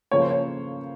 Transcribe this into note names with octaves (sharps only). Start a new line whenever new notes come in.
C#3 F3 A#3 C#5
C5
C#5